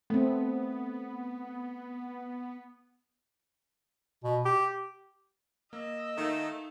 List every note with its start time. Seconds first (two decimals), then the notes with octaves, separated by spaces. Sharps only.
0.10 A3 B3 C4
4.24 B2
4.45 G4
5.73 A#3 D#5 E6
6.18 D#3 A3 D#4 F5